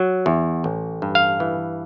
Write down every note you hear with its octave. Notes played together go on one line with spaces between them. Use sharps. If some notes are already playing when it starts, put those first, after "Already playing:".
Already playing: F#3
E2
A1
G2
F5
E3